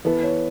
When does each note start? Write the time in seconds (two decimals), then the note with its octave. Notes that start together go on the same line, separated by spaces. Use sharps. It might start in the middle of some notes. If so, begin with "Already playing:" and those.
0.04 E3 B3 E4 A4 B4
0.23 C#5